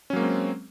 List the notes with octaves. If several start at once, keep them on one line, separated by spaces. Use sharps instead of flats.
F#3 G#3 A#3 C4 C#4